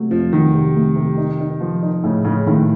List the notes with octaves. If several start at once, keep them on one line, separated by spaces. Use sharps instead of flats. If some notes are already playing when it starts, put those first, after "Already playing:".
Already playing: C3 F#3 A3
F2 F3
D#3 F#3
C3
A3
C3
D#4
D#4
F3
D#4
A2 C#3
A2 C#3
A2 D#3